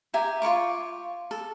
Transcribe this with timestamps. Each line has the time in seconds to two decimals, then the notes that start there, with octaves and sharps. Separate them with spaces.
0.14 G4 E5 G#5 A#5
0.42 F4 B4 C#6 D6
1.31 A4